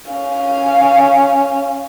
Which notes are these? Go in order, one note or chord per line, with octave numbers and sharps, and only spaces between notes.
C#4 F5